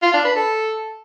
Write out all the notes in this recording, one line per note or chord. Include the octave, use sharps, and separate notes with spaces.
F4
D4
B4
A4